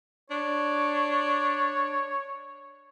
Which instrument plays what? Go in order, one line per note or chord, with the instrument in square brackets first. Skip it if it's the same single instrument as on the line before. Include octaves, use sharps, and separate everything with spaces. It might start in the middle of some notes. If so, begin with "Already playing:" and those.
[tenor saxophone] D4 [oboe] C#5